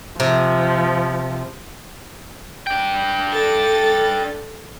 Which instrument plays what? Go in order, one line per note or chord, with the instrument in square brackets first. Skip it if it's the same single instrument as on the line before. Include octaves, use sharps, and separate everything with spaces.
[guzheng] C3 [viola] F3
[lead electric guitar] D4 G5
[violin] A4 A6